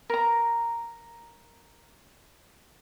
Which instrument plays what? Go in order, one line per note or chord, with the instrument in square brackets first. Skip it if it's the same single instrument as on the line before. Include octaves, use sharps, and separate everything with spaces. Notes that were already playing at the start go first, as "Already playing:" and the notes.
[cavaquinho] A#4 A#5